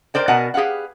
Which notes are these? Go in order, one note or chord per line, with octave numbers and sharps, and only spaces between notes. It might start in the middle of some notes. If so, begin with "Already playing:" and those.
A#4 C5 D5 G5
B2 A#4 F#5 G#5 A5
G4 G#4 B4 F5 F#5